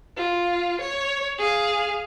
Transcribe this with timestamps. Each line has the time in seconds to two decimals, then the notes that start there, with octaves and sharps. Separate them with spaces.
0.17 F4
0.81 C#5
1.38 G#4 F5